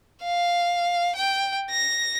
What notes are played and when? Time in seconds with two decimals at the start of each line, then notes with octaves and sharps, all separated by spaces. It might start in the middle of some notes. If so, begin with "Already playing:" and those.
0.23 F5
1.16 G5
1.70 A#6